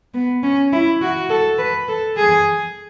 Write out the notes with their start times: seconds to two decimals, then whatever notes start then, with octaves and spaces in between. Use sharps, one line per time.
0.14 B3
0.43 C#4
0.73 E4
1.02 F#4
1.30 A4
1.58 B4
1.88 A4
2.17 G#4